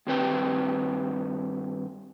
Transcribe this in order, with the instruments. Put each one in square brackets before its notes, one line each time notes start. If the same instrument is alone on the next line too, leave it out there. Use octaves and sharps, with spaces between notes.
[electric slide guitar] G2 D#3 C4 G4 B4 G5